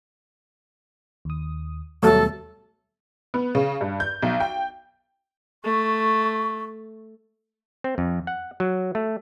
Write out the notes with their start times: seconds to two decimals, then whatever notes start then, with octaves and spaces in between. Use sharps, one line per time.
1.25 D#2 D#6
2.03 D#2 B2 F#3 G3 A3 A4
3.34 B3
3.55 C#3
3.81 G2
4.00 G6
4.22 B1
4.40 G5
5.64 A3 C#6
7.84 C4
7.98 F2
8.27 F#5
8.60 F#3
8.95 A3